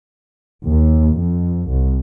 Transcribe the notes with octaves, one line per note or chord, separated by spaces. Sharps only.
D#2
F2
C2